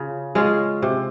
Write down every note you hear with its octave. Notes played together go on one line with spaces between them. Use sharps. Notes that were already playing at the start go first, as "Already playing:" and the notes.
Already playing: C#3 F4
G#3 C#4 F4
C3